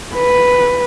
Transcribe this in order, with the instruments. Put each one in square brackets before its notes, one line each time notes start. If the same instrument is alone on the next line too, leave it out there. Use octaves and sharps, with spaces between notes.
[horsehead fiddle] B4